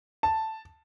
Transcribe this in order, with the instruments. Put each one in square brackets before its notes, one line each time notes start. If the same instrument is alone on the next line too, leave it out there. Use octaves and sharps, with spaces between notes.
[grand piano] A5